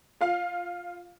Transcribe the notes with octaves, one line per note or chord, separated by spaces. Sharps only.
F4 F5